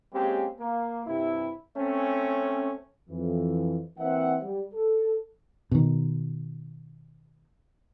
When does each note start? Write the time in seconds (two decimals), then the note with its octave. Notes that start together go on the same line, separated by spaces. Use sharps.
0.13 G#3 A#3 C4 C#4 G4
0.59 A#3
1.07 G2 C3 E4
1.77 A3 C4 C#4
3.10 F2 E3
3.99 E3 A#3 C4 E5 F#5
4.44 G3
4.74 A4
5.71 B2 D#3